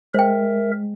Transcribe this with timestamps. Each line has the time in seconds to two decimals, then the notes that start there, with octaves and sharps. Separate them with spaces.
0.14 G#3 A#4 C5 E5 G5